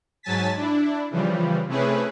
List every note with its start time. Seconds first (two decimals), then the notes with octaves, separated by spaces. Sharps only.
0.23 G#2 F#3 G#5 A5 A6 B6
0.56 D4 E4
1.11 C#3 E3 F3 G3
1.68 C3 A3 C#4 E4 G#4 B4